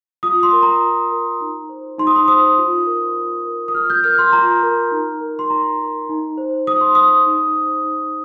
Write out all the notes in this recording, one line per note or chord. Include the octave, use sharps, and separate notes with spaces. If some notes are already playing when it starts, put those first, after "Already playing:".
F4 D#6
C6
A#4
A#5
F4
A#4
D#4
C5
D#4 C6
D#6
C6
C5 D#6
F4
A#4
F4
A#4
D#6
F4 F6
G6
A#4 F6
C6
F4 A#5
A#4
D#4
A#4
C6
D#4 A#5
A#4
D#4
C5
D#4 D#6
C6
C5 D#6
D#4
C5
D#4